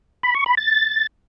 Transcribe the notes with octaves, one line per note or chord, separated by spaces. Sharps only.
B5
C#6
B5
A6